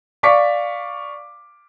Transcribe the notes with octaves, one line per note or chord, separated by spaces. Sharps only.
D5 F5 C#6 D6 B6